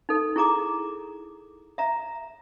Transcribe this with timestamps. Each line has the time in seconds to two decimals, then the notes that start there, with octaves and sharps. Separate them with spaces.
0.09 D#4 A4
0.36 E4 G#4 A#5 D6
1.78 E5 A#5